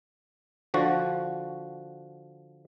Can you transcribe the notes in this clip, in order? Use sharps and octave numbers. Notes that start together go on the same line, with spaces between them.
D3 F3 F#4